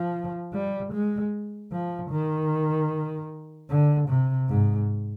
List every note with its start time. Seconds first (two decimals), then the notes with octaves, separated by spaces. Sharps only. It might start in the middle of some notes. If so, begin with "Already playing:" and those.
Already playing: F3
0.53 G3
0.93 G#3
1.72 F3
2.11 D#3
3.69 D3
4.09 C3
4.48 G#2